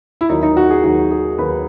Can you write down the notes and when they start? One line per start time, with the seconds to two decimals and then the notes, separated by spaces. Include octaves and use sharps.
0.21 E4
0.29 D#2 D#3 F#3 D#4
0.43 D#4
0.57 F#4
0.70 G#4
0.84 D#2 D#3 F#3 F#4
1.11 G#4
1.38 D#2 D#3 F#3 B4